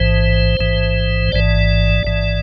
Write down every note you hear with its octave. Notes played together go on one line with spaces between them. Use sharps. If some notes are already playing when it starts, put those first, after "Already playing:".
Already playing: A1 G#2 E3 C5
A1 G#2 E3
A1 G#2 E3 D5
A1 G#2 E3